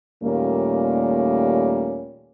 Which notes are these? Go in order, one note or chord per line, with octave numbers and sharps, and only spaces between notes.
D#2 A#2 G3 A3 A#3 C#4